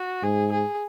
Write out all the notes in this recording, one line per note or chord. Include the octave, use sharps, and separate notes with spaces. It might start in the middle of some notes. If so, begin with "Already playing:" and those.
Already playing: F#4
G#2 G#4
G#4